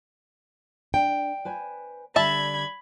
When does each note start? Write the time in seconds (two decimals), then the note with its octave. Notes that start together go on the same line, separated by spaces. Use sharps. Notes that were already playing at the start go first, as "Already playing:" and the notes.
0.94 D4 G5
1.45 B4 C5 G#5
2.16 D3 G3 E5 A5 B5 G#6